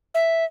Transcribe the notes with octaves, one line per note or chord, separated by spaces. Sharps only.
E5